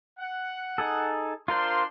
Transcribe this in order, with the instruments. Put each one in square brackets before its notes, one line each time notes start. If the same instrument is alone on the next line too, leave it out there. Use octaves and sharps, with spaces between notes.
[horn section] F#5
[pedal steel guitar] D#4 G#4 A4
[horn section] D4 C6 [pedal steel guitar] F4 A#4 C5